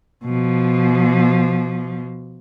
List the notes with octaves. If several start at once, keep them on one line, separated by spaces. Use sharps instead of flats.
B2 F3